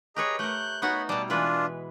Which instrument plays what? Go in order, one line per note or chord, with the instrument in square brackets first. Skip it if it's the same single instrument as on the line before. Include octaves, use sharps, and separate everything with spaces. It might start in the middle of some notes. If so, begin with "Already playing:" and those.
[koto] G4 B4 C#5 [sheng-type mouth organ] G#4 D#5 A#5
[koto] A3 A#4 [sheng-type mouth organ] F#6 G6
[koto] B3 D#4 F#4 [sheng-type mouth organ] C#5 B5
[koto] B2 G3 [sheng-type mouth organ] D5 A5
[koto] E3 G#3 B4 [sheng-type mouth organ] D4 F4